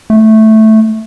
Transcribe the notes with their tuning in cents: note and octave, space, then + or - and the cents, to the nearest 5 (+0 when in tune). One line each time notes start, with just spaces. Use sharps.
A3 -5